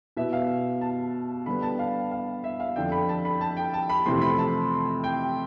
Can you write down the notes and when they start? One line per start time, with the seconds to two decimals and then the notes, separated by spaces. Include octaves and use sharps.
0.17 B2 B3 E4 E5
0.33 F5
0.81 A5
1.46 D3 G3 B3 B5
1.62 A5
1.79 F5
2.11 F5
2.44 E5
2.60 F5
2.76 F2 D3 F3 G5
2.92 B5
3.09 A5
3.25 B5
3.41 A5
3.57 G5
3.74 A5
3.89 B5
4.06 F2 C3 E3 A3 C4 C6
4.21 B5
4.38 A5
5.04 G5